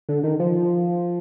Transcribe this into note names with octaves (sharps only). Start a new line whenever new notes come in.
D3
D#3
F3